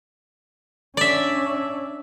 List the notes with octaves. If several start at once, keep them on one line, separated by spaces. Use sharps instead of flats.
C#4 D4 D5 E5